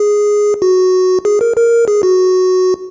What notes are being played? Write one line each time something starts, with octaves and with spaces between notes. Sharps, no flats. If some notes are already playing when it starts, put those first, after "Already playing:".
Already playing: G#4
F#4
G#4
A#4
A#4
G#4
F#4